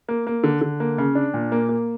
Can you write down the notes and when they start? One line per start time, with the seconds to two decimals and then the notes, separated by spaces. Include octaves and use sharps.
0.09 A#3
0.27 A#3
0.43 D3
0.61 D3
0.80 A#3
0.98 C#3
1.15 D4
1.34 A#2
1.52 A#3
1.69 A#3